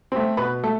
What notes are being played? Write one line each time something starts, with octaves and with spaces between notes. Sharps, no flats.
A3 C4
B2 B4
A3 A4